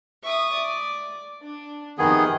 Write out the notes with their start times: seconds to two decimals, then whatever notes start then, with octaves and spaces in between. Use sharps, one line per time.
0.24 E5 C#6 D#6
0.54 D5
1.41 D4
1.98 F2 C3 D#3 B3 G#4 D#5